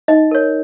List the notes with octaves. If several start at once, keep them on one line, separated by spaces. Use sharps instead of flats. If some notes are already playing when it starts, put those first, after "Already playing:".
D#4 D#5
A#4 C#5